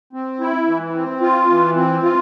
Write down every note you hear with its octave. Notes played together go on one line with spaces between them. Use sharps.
C4
E4
E3
C4
F4
E3
C4
F4